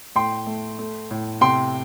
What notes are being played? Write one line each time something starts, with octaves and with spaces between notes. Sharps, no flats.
A2 G5 C6
A3
A3
A2
C3 G5 C6